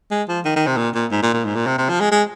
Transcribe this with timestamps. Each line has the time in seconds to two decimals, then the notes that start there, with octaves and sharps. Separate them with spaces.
0.11 G#3
0.28 F3
0.45 D#3
0.56 D#3
0.67 C3
0.77 A#2
0.95 A#2
1.11 G#2
1.23 A#2
1.34 A#2
1.45 G#2
1.56 A#2
1.67 C3
1.78 C3
1.89 F3
2.00 G#3
2.11 G#3